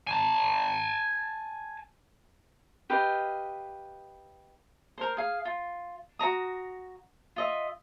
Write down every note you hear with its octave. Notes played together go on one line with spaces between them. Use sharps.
G#5 A5
G4 B4 D#5 F5
A#4 C5
G#4 F5
F4
F#4 C#5 A#5 D#6
F4 D#5 E5